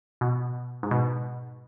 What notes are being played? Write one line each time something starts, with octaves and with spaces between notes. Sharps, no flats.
B2
G#2
B2